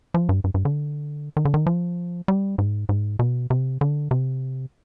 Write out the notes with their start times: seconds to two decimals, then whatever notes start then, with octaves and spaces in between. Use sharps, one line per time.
0.14 F3
0.29 G2
0.44 G2
0.54 G2
0.65 D3
1.37 D#3
1.45 D3
1.54 D#3
1.66 F3
2.28 G3
2.58 G#2
2.89 G#2
3.19 B2
3.50 C3
3.81 D3
4.11 C3